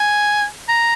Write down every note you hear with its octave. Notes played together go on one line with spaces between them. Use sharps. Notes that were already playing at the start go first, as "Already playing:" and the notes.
Already playing: G#5
A#5